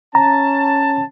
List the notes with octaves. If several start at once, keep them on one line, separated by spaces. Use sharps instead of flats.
C#4 A5 A#5